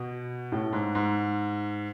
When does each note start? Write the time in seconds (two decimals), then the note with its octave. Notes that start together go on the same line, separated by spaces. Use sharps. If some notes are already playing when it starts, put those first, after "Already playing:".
Already playing: B2
0.52 A2
0.73 G#2
0.95 G#2